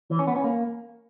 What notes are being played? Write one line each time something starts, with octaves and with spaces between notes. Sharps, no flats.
E3
C#4
B3
C#4
A#3